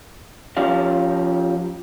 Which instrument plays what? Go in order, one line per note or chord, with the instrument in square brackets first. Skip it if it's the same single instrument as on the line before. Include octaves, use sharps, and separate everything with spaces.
[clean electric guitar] F3 C#4 G4 F5